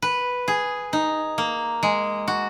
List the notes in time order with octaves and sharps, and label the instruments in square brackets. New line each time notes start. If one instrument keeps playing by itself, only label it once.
[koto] B4
G#4
D#4
A#3
G#3
F#4